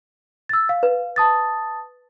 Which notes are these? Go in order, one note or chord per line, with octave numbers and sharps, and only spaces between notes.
E6 A6
F5
B4
A5 D#6 A6